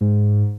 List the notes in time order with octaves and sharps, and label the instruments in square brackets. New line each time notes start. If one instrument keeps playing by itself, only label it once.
[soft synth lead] G#2